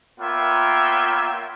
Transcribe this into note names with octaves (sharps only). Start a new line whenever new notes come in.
A#3 B3 F4 C#5 E5 G5